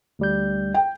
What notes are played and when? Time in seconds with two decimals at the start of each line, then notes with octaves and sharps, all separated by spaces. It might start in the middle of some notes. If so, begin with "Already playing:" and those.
0.19 D2 G3 G6
0.74 G5